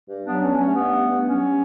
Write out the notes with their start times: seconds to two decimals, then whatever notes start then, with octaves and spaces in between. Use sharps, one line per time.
0.09 G2
0.25 F#3 B3 D4
0.41 G2 C#4
0.58 A3 C#4
0.75 G2 B3
0.92 A3
1.09 G2
1.25 F#3 C#4